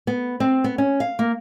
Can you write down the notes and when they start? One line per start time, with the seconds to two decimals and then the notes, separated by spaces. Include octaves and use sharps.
0.07 B3
0.40 C4
0.64 B3
0.78 C#4
1.00 F5
1.19 A#3